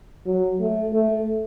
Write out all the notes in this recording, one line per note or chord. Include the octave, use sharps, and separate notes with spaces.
F#3
A3
A3